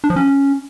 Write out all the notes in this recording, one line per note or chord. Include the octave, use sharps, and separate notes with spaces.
D4
F3
C#4